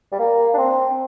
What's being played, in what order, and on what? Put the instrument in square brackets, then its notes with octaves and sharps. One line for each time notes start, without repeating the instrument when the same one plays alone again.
[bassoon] G3
A#3
D4
C4